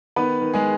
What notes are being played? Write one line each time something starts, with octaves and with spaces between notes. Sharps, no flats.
D#3 B3 B4
D#3
G#3 G#4